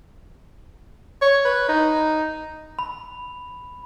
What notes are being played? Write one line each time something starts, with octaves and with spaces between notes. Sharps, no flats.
C#5
B4
D#4
B5